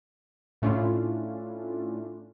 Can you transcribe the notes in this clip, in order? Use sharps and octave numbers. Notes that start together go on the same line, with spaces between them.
A2 A3 C#4 D4 E4 F4